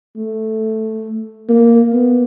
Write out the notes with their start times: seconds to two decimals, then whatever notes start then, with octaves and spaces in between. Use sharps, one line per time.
0.17 A3
1.49 A#3
1.93 B3